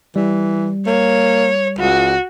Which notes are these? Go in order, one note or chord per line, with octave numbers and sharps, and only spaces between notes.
E3 G3
A#3 C#5
C#2 F#4